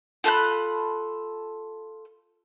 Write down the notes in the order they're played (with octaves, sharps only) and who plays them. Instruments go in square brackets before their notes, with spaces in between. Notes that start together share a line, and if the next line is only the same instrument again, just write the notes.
[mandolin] F4 A4 B5 F#6